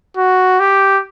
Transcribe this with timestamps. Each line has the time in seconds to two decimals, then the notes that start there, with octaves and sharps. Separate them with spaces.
0.17 F#4
0.60 G4